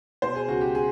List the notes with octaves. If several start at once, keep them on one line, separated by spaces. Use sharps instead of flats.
B2 C5
G#4
C#2 F#4
G4
G#4